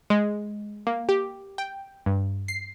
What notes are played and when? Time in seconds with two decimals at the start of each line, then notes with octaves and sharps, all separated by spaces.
0.10 G#3
0.87 A#3
1.09 G4
1.58 G5
2.06 G2
2.48 C7